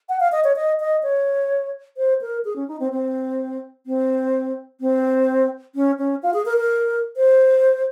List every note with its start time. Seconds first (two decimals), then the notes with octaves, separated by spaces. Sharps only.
0.09 F#5
0.20 F5
0.32 D#5
0.44 C#5
0.56 D#5
0.80 D#5
1.03 C#5
1.97 C5
2.21 A#4
2.45 G#4
2.56 C#4
2.68 D#4
2.80 C4
2.92 C4
3.86 C4
4.81 C4
5.75 C#4
5.98 C#4
6.23 F4
6.34 G#4
6.45 A#4
6.57 A#4
7.17 C5